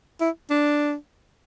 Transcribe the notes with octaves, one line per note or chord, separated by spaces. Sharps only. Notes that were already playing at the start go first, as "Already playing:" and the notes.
E4
D4